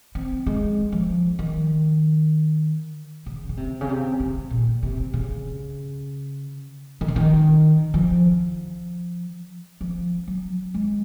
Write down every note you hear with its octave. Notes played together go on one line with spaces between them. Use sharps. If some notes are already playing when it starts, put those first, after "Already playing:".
C4
G#3
F3
D#3
C#3
C#3
C3
C#3
C3
C3
A#2
C3
C#3
D#3
C#3
D#3
F3
F3
F#3
G#3